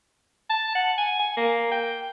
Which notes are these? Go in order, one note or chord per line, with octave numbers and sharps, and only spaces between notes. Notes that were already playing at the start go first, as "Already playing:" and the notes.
A5
F#5
G#5
G#5
A#3
G5